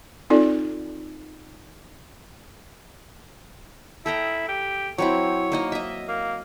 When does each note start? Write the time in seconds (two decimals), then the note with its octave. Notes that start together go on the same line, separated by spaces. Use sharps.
0.30 C4 D#4 F4 A4 D5
4.06 E4 A4 G5 A#5
4.49 G4
4.98 F#3 C4 E4 C#5
5.52 A#3 D#4 D#5
5.72 D#5 E5
6.08 A#3